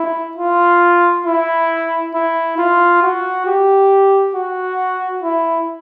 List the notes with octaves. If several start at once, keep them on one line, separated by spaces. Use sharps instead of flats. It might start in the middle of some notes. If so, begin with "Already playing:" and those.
Already playing: E4
F4
E4
E4
F4
F#4
G4
F#4
E4